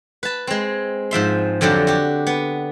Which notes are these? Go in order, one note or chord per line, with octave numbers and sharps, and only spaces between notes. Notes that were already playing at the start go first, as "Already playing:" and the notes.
B4 A5
G#3 C4
G#2 F3 E5 C6
F2 D3 F3 F#3 G4
F#4 G4
B3